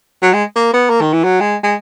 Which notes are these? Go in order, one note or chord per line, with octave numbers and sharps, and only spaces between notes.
F#3
G#3
A#3
B3
A#3
D#3
E3
F#3
G#3
G#3